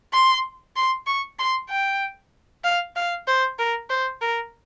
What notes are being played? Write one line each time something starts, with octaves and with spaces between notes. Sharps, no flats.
C6
C6
C#6
C6
G5
F5
F5
C5
A#4
C5
A#4